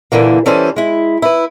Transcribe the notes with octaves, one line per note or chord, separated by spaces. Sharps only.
A#2 D3 E3 A#3
E3 G3 C#4 A4 B4 C5
G#3 E4
E4 B4